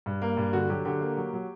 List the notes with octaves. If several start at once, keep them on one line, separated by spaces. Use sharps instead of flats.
G2
A#3
G2
D3 F#4
F#3 G4
D3 G4
A#3
F#3
F#3